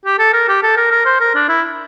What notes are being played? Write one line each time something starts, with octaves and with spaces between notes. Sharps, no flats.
G4
A4
A#4
G4
A4
A#4
A#4
C5
A#4
D4
E4